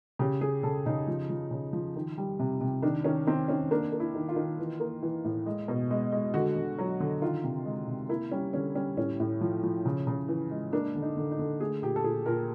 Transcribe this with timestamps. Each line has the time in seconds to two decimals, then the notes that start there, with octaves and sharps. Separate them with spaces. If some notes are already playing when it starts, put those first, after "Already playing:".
0.19 C#3 G4
0.41 C#3 G#4
0.63 C#3 A4
0.86 C#3 D#4
1.08 F3
1.30 F3
1.51 C#3
1.73 F3
1.96 D#3
2.18 G3
2.39 C3
2.61 C3
2.82 D#3 D4
3.04 D#3 C#4
3.27 D#3 C4
3.48 D#3 C#4
3.71 A#3 D4
3.92 A#3
4.00 E4
4.15 D#3
4.29 F4
4.36 D#3
4.59 E3
4.80 A#3
5.03 E3
5.25 A2
5.46 G#3
5.68 B2
5.91 G#3
6.12 G#3
6.34 D3 F#4
6.56 D3
6.78 F#3
7.00 D3
7.21 D#3 F4
7.44 C3
7.66 G#3
7.87 C3
8.09 A#3 E4
8.31 G3 C#4
8.53 D3 C#4
8.75 G3 C#4
8.97 A2 C#4
9.20 A2
9.41 F3
9.63 F3
9.86 C#3
10.07 C#3
10.28 E3
10.51 G#3
10.73 A#3 D4
10.95 D3
11.02 D#4
11.17 D3
11.31 D#4
11.39 D3
11.60 A3 G#4
11.82 A#2 G4
11.96 A4
12.04 A#2 G#4
12.26 A#2 A#4